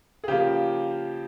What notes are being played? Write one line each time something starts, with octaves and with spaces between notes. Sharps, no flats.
G#4
C#3 F3 A#3 G4